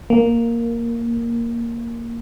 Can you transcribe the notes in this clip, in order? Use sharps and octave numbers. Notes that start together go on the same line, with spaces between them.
A#3